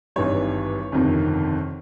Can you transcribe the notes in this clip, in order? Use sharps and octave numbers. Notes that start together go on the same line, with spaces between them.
G#1 G2 E3 G3 C#5
G1 F2 C3 D#3